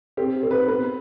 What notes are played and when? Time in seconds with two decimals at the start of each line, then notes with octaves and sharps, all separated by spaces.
0.17 C4 G4
0.43 C4
0.51 B4
0.68 B3 B4